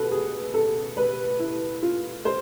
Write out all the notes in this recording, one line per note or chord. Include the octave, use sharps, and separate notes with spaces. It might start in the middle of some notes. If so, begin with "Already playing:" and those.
Already playing: B2 A4 B4
G#4
A4
B4
E4
F4
C5